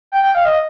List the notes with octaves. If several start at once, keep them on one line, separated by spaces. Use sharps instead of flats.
G5
G5
F5
D#5